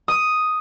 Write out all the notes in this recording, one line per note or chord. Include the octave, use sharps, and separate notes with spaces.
D#6